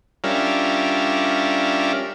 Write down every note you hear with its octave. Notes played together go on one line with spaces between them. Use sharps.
G3 C#4 D4 F4 A#4 E5